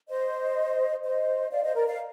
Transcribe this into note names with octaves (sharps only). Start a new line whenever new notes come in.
C5 D#5
C5 D#5
D5 F5
C5 D#5
A#4 D5
D5 F5